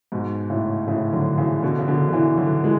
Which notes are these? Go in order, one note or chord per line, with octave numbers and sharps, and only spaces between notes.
G#2 B2
A2 C#3
A2 C#3
D3 F#3
C#3 E3
B2 D3
C#3
B2 D3
D3
C#3 E3
D3 F#3
E3 G#3